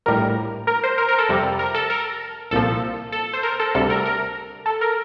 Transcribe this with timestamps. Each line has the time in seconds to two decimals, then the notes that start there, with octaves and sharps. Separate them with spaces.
0.06 A#1 A2 G3 A#4
0.67 A#4
0.84 C5
0.98 A#4
1.09 A#4
1.18 A4
1.29 F2 C3 G3
1.59 A#4
1.74 A4
1.90 A#4
2.51 C2 A#2 F3 A4
3.12 A4
3.33 C5
3.43 A#4
3.60 A4
3.74 D2 C3 G3 A4
3.90 A#4
4.05 A#4
4.66 A4
4.81 A#4